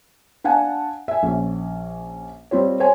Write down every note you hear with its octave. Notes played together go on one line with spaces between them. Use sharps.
D4 F5 F#5 G#5 A5
E5 G#5
A#1 C#4
G3 C4 F4 C#5
C5 C#5 G#5